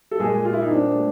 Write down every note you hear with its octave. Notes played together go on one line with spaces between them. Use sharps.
A4
A#2 G#3 G#4
A#2 F4
E4
D#4
C4 D4
A3